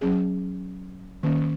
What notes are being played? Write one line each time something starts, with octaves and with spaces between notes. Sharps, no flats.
F#3 C#4 G#4
D#3 A#3 C#4